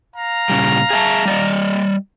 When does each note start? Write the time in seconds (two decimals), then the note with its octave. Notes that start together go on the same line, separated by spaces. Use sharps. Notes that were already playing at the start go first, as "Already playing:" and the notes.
0.15 F5 A#5
0.50 A#2 C#3 G3
0.90 G#4 E5 A5
1.26 G3 D5 D#5